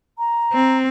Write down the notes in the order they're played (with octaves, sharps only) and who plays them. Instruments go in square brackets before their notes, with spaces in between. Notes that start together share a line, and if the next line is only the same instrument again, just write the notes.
[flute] A#5
[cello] C4